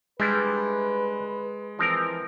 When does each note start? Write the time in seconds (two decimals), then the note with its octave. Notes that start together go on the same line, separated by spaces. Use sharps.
0.20 G3 G#3 D4 E4 B4
1.79 E3 F3 C4 A#4